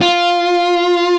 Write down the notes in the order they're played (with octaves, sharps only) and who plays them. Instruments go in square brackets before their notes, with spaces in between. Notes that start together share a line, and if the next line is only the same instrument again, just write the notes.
[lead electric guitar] F4